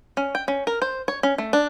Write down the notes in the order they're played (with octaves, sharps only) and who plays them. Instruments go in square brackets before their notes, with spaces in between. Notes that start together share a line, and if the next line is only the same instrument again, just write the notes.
[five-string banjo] C#4
G5
C#4
A#4
C5
C#5
C#4
A3
D4